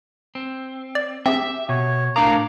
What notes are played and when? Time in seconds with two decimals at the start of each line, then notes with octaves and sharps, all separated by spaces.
0.35 C4
0.95 D5
1.26 C4 G4 G#4 E5
1.69 B2 C#5
2.16 A2 D4 A#4 F5 A#5 D6 D#6